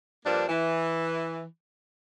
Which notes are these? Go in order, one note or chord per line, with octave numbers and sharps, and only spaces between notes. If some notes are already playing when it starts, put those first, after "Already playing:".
G2 F3 A#3 D4
E3